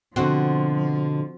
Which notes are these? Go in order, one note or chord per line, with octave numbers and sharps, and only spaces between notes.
B2 D3 F3 C4 F#4